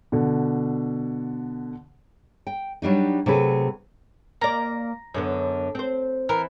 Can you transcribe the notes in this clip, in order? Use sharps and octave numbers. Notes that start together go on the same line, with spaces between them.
B2 D3
G5
F#3 G3 D4 D#4
C3 F#3 A3 G#4 B4
A#3 D5 A#5
F#2 D3 B3
C4 C5
E3 A#4